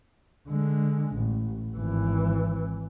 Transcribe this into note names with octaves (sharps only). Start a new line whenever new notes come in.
D3 G#3
A1
G#1 E3